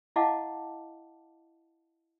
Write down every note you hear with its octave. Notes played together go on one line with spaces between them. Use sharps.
E4 D#5 F5 F#5 A5 D6